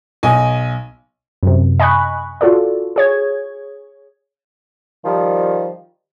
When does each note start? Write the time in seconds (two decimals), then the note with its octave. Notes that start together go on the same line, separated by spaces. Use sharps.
0.23 B1 D#5 G#5
1.43 F#2 C3
1.80 D#5 G#5 B5 C#6 F#6
2.41 F4 F#4 A4 D5
2.96 G#4 C#5 G#6
5.05 D#3 F3 G3